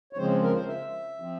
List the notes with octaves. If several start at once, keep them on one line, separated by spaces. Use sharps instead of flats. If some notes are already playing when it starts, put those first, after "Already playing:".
C#5
C#3 F3 G#3 C4 C5
A#4
C5
E5
F3 C4